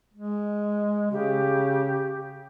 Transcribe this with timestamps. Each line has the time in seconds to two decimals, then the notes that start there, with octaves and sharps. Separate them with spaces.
0.14 G#3
1.11 C#3 G4